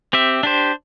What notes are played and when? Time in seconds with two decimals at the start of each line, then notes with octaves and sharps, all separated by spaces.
0.13 C4 G4 E5
0.43 D4 G4 C5